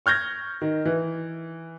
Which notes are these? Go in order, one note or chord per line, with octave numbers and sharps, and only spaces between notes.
C#6 F6 G6 G#6 A#6
D#3
E3